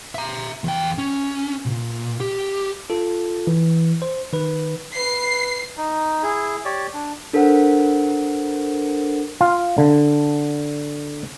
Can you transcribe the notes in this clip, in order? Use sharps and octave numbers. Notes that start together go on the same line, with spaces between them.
E5 A#5
E2 G5
C#4
B1 A#2
G4
F4 A4
E3
C5
D#3 B4
B4 C7
D#4
E4 G#4
G4 C#5 D5
D4
D4 A4 A#4 C5 F#5
F4
D3